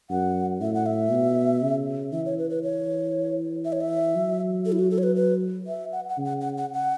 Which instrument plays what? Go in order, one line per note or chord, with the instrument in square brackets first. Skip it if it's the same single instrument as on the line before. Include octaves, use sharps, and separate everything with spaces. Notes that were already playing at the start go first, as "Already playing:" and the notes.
[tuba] F#2 [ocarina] F#5
[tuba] A2 [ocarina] E5
[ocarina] F#5
E5
[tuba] B2
C#3
[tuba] E3 [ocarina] E5
[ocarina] C#5
B4
B4
C#5
E5
C#5
E5
[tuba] F#3
[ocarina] A4
E4
F#4
A4
C#5
B4
B4
E5
F#5
F#5
[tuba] C#3
[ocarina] F#5
F#5
F#5
F#5